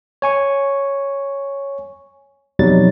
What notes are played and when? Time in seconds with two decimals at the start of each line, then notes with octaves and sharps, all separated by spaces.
0.22 C#5 G#5 C#6
2.59 F2 B2 F#3 G3 D#4 A6